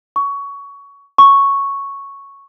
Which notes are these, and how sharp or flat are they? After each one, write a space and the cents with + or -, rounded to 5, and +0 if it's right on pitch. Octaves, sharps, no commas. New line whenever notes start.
C#6 +20
C#6 +0